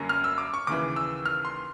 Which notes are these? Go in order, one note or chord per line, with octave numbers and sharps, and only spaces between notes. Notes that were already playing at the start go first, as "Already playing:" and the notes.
Already playing: F#2 D3 G3 A#3 C#4
F6
E6
D6
C#6
D#2 C#3 E3 D6
E6
F6
C6